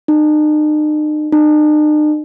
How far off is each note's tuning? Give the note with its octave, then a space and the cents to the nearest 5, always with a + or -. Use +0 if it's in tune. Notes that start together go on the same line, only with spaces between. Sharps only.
D#4 -40
D#4 -45